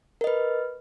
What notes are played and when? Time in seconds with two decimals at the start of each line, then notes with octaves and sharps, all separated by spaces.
0.21 A#4
0.24 D#5
0.27 B4